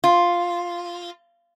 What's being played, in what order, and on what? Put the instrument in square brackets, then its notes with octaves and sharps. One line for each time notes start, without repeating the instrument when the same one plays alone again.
[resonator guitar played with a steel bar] F4